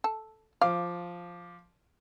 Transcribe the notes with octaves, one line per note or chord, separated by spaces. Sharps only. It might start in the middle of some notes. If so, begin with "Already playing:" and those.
A4
F3 F5 D6